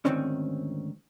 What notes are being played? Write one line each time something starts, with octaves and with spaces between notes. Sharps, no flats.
D2 G#2 D#3 C4 C#4